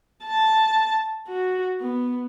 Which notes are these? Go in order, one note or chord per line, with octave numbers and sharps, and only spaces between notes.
A5
F#4
B3